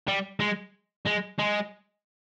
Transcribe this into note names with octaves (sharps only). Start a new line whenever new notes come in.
G3
G#3
G#3
G#3